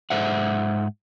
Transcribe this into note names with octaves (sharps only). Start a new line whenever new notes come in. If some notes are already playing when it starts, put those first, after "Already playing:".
G#2 C5 E5 F#5